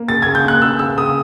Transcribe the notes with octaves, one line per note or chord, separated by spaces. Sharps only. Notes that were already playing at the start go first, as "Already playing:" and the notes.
Already playing: A#3
C#3 A6
C#3 G#6
G6
A#3 F#6
C#3 E6
C#3 E6
C#3 D#6